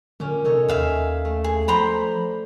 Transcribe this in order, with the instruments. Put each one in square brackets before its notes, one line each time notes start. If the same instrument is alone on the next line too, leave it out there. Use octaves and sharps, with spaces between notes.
[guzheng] A#2 C#4 [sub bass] D3
[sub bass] C3 [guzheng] D#4 A4 C#5
[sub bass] D#2 [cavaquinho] E5 F5 G#5
[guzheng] A3
[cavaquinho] G#4
[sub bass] F3 [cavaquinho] C5 A#5 B5 [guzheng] D5